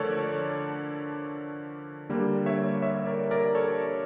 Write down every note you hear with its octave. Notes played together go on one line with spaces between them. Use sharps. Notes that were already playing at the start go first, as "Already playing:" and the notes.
Already playing: D3 F3 A3 A4 A#4 C#5 D5
D3 G3 A#3
C#5 E5
C#5 E5
A#4 D5
A#4 D5
A4 C#5